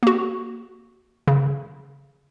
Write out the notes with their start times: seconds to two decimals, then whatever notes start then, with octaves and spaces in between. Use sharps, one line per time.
0.03 A#3 F#4
1.28 C#3